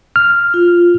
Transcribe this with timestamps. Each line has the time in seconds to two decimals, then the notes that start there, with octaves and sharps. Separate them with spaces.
0.16 F6
0.54 F4